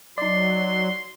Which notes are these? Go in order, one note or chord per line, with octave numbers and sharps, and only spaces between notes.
F#3 D#4 D5 C6